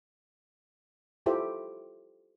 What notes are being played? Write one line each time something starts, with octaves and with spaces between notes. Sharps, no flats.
E4 F4 G4 A4 C5 E5